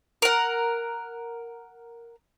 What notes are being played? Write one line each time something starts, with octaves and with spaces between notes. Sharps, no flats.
A#4 F#5